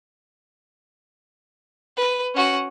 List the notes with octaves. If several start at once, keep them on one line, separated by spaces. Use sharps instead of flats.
B4
C#4 F#4